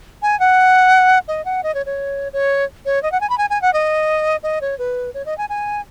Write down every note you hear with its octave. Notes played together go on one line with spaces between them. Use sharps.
G#5
F#5
D#5
F#5
D#5
C#5
C#5
C#5
C#5
D#5
F#5
G#5
B5
G#5
G#5
F#5
D#5
D#5
C#5
B4
C#5
D#5
G#5
G#5